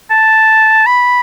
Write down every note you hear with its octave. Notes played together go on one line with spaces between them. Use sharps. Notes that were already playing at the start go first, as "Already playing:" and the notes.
A5
B5